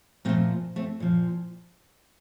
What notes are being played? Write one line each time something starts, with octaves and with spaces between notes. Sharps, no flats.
A#2 F3 A3 C4
A3 C4
A#2 F3